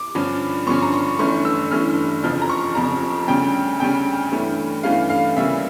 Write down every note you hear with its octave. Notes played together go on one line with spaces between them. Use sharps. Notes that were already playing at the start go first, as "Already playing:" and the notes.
Already playing: D6
G2 D3 F3 C#4
G2 D3 F3 C#4 C#6
A#5
C#6
G1 G2 E3 A3 C#4 C#6
E6
G1 G2 E3 A3 C#4 F6
F1 F2 C#3 F3 F6
A#5
C#6
F1 F2 C#3 F3 A#5
D2 C#3 G3 C#4 G5
D2 C#3 G3 C#4 G5
G2 E3 A3 C#4
G2 E3 A3 C#4 F5
F5
D2 C#3 G3 A#3 C#4 E5